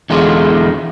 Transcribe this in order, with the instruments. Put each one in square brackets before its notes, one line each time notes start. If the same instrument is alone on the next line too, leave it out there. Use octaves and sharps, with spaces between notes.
[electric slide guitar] E2 D3 G#3 F4